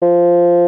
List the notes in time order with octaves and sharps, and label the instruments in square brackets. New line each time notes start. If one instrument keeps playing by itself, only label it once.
[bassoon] F3